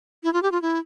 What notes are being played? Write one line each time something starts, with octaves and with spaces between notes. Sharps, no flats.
E4
F4
G4
F4
E4